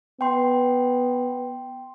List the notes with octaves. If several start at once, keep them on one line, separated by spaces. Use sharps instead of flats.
B3 G5 C6